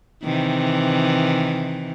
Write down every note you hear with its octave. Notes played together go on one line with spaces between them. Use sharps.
C3 D#3 E3